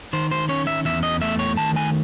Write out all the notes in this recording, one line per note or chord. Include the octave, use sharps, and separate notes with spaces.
D#3 C5
C5
C#4 C#5
E5
E2 E5
D#5
A3 E5
C#5
D#3 A5
G#5